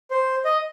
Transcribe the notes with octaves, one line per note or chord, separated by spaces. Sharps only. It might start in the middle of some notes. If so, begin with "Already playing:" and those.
C5
D#5